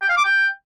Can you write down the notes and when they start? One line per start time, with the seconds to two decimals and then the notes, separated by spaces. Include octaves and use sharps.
0.02 G5
0.09 F5
0.17 D6
0.25 G5